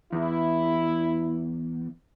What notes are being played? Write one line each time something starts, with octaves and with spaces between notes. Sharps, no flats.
E2 E4